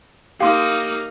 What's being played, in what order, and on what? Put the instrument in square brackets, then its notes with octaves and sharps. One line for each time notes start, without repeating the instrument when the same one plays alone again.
[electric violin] A#3 D#4 [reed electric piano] G4 D6 [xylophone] F5 C6